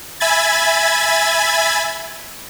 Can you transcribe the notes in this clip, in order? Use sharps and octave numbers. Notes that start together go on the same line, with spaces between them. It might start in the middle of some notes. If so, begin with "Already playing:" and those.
E5 G#5 B5 G#6 A6